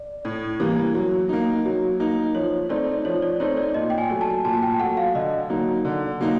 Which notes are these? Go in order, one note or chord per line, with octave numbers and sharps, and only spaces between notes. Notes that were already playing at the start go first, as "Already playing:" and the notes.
Already playing: D5
A2
E3 G3 A#3
F#3
A#3 D#4
F#3
A#3 D#4
F3 C#5
A3 C4 D#4 D5
F3 C#5
D5
A3 C4 D#4 C#5
D5
A#2 D#5
G5
G#5
F#3 A3
A5
A#2 A5
G5
F#3 A3 F#5
F5
D3 D#5
F#3 A#3 D#4
D3
F#3 A#3 D#4